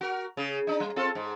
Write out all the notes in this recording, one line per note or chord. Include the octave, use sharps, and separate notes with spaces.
F#4 A#4
C#3 G#4
D4 D#4
G3
C4 F4 A4
G#2